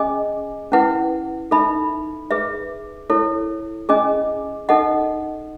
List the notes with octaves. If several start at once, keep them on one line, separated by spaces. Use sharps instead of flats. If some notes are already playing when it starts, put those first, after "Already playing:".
Already playing: C#4 G#4 D#5 G#5
C#4 E4 B4 F#5
D#4 A4 E5 B5
G#4 B4 E5
E4 A4 C#5
C#4 G#4 D#5 G#5
D#4 A4 D#5 F#5